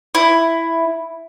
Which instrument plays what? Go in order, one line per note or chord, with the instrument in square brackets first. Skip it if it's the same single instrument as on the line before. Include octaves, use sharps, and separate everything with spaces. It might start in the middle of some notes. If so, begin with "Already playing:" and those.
[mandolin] E4